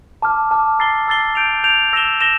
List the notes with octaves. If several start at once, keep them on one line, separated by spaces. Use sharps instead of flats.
A5 D6 F6
A5 D6 F6
A#5 E6 A6 C7 G7
A#5 E6 A6 C7 G7
G6 D7 F7
G6 D7 F7
E6 A#6 E7 G7
E6 A#6 E7 G7